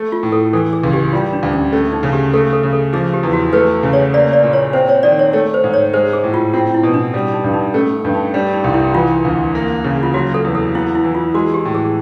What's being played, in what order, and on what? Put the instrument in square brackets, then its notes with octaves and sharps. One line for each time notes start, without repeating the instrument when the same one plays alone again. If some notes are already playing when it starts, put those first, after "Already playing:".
Already playing: [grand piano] A3
[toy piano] F4
[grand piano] A2
[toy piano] A4
[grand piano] E3 [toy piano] A4
[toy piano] G#4
[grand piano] C#2
[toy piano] G4
[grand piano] G3 [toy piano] F4
[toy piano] D4
[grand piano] D2
[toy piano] C#4
[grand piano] A3 [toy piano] C#4
[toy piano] D#4
[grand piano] C#3
[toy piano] G4
[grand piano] A3 [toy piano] A4
[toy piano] A4
[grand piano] C#3
[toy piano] A4
[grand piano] F3 [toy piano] G#4
[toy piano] G4
[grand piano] E2
[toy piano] F#4
[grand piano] A3 [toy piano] B4
[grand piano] C#3
[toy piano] C#5
[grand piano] A#3 [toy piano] D5
[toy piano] D5
[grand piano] A#2
[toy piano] C#5
[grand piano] C4 [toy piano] C5
[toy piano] C#5
[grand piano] D#3 [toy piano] D5
[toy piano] C#5
[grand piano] A3 [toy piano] C#5
[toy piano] C5
[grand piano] G#2
[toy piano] C#5
[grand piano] G#3 [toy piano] C5
[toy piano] G#4
[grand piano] A2
[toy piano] F4
[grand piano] C4 [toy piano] F4
[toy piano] E4
[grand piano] B2
[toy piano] D4
[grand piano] G3
[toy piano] D#4
[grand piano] G2
[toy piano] D#4
[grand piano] A3 [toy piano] C#4
[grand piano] G2
[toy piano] D#4
[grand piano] G3 [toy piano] D4
[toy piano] D#4
[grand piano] C2
[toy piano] E4
[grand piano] E3 [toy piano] F4
[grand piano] D2
A#3
C#3
[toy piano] F4
[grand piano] F#3 [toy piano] F#4
[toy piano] A4
[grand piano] E2
[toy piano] A4
[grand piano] B3 [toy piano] E4
[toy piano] E4
[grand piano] E3
[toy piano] F4
[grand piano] G#3 [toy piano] F#4
[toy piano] G4
[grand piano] A2
[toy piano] G#4